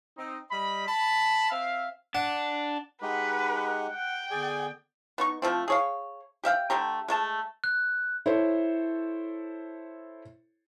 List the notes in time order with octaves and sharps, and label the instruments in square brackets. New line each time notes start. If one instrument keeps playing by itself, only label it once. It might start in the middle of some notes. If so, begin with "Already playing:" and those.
[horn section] C4 D#4
G3 D#5 B5
A5 B5
C4 E5 F5
[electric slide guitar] D4 [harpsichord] F#5
[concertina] G#3 D#4 G4 [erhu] B4 [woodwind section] F#5
[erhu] G5
[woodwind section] D3 B3 D5 [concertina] G#4 G#5
[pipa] B3 D#4 C#6
F3 A3 C4
G#4 C#5 F5
G4 E5 F5 G5
D3 A3 G4 A#5
G#3 A3 A5
[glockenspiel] F#6
[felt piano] E4 A4 C5 C#5